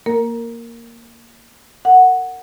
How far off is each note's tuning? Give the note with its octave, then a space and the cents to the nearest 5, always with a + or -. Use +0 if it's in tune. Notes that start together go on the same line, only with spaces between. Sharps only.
A#3 +0 A#4 -10
A#4 -30 F#5 +0